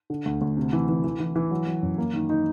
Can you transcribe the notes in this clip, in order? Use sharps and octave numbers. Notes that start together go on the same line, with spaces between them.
D3
D2
D2
C3
E3
E3
E3
E3
E3
F#3
F#3
F#2
A#3
D#3
D#4